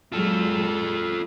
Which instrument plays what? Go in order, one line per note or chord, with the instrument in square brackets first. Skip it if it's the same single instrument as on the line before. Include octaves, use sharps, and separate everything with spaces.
[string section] A#2 F#3 G#3 [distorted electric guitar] F4 A4